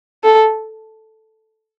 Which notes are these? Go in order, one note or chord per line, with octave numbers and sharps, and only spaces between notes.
A4